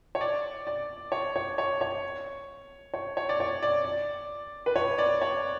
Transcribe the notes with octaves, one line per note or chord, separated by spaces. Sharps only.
C#5
D5
D5
C#5
C#5
C#5
C#5
C#5
C#5
D5
C#5
D5
D5
B4
C#5
D5
C#5